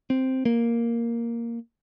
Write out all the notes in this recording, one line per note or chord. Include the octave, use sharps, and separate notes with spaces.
C4
A#3